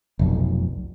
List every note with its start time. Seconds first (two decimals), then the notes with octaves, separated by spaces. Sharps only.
0.19 F1 B1